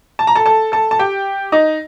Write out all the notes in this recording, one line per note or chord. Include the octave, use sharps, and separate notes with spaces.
A5
A#5
A4 A5
A4 A5
A4 A5
A5
G4 G5
D#4 D#5